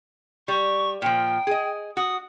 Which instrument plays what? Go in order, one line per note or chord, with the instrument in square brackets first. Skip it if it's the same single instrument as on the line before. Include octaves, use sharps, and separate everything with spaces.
[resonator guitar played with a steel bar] G3 [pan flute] C#6
[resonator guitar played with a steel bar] A#2 F3 [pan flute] G5
[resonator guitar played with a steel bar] G#4 D#5
[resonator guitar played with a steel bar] F#4 [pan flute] D#6